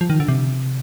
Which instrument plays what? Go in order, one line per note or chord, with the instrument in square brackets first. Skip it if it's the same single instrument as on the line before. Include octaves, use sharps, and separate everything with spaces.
[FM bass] F3
D#3
D3
C3